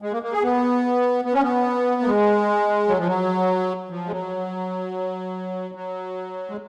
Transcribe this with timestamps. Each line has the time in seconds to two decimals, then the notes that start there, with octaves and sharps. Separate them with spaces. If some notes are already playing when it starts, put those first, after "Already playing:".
0.02 G#3
0.13 A#3
0.23 A#3
0.32 G#4
0.43 B3
1.25 B3
1.33 C#4
1.43 B3
2.02 A#3
2.07 G#3
2.89 F#3
2.98 F3
3.07 F#3
3.91 F3
4.07 G#3
4.12 F#3
5.75 F#3
6.49 G#3